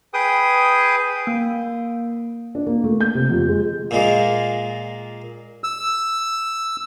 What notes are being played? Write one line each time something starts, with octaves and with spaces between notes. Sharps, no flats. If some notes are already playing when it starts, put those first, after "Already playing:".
G#4 B4 G5 D#6
A#3
D4
A#3
A3
G6
C3
F2
G#3
A#2 G#3 A#3
E6